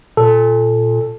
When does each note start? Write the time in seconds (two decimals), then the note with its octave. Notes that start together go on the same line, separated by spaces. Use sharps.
0.17 A#2 A4